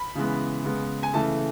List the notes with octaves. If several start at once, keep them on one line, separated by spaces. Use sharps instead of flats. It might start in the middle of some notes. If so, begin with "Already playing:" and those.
Already playing: B5
C#3 E3 G#3 B3
C#3 G#3 B3
G#5
C#3 E3 A3 A5